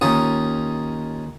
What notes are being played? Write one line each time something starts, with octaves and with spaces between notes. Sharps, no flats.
D#2 C#4 D#4 F4 D#6